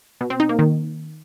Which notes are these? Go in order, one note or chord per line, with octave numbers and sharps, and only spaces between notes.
B2
C4
D#4
A#3
D#3